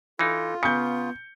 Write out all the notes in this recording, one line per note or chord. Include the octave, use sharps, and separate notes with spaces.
E3 D#4 F4 A4
C#3 B3 G6 C#7